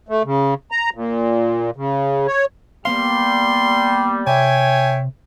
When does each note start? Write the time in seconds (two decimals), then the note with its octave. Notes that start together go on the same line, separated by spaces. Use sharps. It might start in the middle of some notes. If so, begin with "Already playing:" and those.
0.09 A3
0.25 C#3
0.72 A#5
0.94 A#2
1.76 C#3
2.27 C#5
2.85 G3 A#3 B3 F5 C6
4.27 C3 C#5 E5 G5 G#5